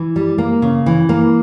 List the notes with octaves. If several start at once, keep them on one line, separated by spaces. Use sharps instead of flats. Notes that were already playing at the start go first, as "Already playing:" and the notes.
Already playing: E3
G3
A#3
C#3
E3
A#3